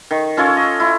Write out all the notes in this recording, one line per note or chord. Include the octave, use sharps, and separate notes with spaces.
D#3
C#4 F4 A4 C#5
D#5
E4 C6